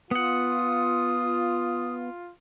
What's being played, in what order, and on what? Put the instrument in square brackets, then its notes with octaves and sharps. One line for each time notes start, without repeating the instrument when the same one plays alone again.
[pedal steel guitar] B3 F#5 [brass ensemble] F4 [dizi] D#6